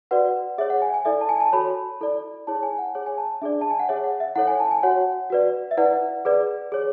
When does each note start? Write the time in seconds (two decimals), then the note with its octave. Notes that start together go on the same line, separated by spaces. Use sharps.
0.11 F#4 B4 D5 F#5
0.58 G#4 C#5 E5
0.70 F#5
0.82 G#5
0.94 G#5
1.05 E4 A4 D5 E5
1.21 A5
1.29 G#5
1.40 A5
1.53 F#4 A4 C#5 B5
2.00 E4 A4 D5
2.47 E4 G#4 C#5 A5
2.63 G#5
2.78 F#5
2.95 G#4 C#5
3.06 G#5
3.18 A5
3.41 D4 G#4 D5 E5
3.61 A5
3.71 G#5
3.79 F#5
3.89 G#4 C#5 E5
4.04 F#5
4.20 E5
4.35 E4 A4 C#5 F#5
4.48 G#5
4.60 A5
4.71 G#5
4.83 F#4 C#5 F#5
5.30 F#4 B4 D5
5.71 E5
5.77 E4 B4 D5 F#5
6.25 G#4 B4 D5
6.72 G#4 C#5